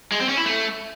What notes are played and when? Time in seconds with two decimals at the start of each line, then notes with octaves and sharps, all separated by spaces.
0.12 G#3
0.20 C4
0.29 C#4
0.37 E4
0.46 A3